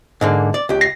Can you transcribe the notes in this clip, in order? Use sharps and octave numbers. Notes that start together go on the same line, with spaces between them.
G#2 D3 A#3
D5
C#2 G4
A#6 C7